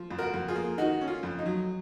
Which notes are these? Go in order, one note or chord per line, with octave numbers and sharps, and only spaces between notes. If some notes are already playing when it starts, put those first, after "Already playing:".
Already playing: F3
F2
F#4 A#4
F2
F4 G#4
A#3
D#3 D#4 F#4
C#4
F4
F2
D#4
F#3